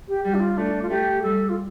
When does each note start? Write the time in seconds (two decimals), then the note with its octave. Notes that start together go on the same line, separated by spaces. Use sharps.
0.08 G4
0.24 G3 G4
0.34 D4
0.40 F4
0.57 A3 D4
0.82 F4
0.89 A3 G4
1.23 G3 A4
1.49 F4